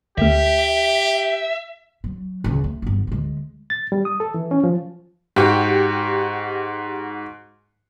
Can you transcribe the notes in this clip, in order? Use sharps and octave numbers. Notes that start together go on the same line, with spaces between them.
D2 A3 G4 E5
F#3
C#2 C#3
A3
G1 B3
D2 G#3
A6
G3
D#6
A4
E3
C#4
F3
G#2 F#4 G4